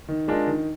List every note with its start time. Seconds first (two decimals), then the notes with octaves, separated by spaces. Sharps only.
0.08 D#3
0.28 G#3 D4 F4 A#4
0.47 D#3